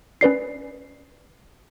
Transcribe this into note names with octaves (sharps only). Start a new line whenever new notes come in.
C#4 B4 D5 C7